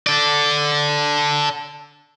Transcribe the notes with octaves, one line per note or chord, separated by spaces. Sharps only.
A4 D5